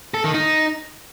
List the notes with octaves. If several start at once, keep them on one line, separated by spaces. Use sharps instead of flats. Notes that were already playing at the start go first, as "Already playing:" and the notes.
A4
D#3
D#4